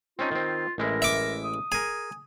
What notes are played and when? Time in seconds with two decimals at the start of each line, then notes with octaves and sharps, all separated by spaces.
0.19 C4 C#4 D#4 F4
0.31 D#3 C4
0.78 A1 G#3 E4 A#4
1.02 E5 D6
1.44 D#6
1.72 G#4 A#4 G#5